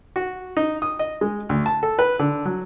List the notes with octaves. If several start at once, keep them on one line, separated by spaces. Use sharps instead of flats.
F#4
D#4
D#6
D#5
G#3
D2
A5
A4
B4
D3
F#3